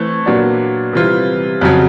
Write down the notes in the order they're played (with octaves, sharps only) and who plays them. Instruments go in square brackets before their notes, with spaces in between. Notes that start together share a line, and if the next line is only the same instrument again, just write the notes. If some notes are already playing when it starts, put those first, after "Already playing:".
Already playing: [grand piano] E3 A3 C4
A#2 F#3 B3 D4
C3 E3 G3 C4 F4
F2 C#3 F#3